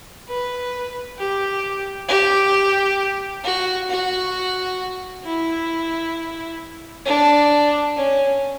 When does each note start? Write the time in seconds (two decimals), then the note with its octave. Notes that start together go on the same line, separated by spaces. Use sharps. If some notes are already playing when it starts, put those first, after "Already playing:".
0.28 B4
1.18 G4
2.08 G4
3.44 F#4
3.90 F#4
5.25 E4
7.05 D4
7.96 C#4